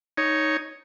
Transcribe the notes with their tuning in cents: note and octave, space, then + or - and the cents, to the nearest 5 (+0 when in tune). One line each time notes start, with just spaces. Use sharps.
D#4 +0 C#5 +0